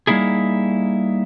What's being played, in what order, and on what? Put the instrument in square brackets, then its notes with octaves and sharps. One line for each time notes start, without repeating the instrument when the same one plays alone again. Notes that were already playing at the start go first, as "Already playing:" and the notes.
[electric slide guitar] G3 A#3 D#4 E4 G#4